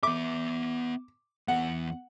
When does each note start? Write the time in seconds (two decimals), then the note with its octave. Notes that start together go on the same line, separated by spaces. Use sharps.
0.03 B3 E5 D6
1.48 E2 B3 F#5